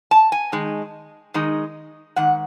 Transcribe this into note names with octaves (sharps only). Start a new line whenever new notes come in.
A5
G#5
D#3 G#3 D#4
D#3 G#3 D#4
G#2 D#3 F#5